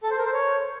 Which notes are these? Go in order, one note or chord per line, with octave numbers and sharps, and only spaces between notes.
A4
C5
A#4
C5
C#5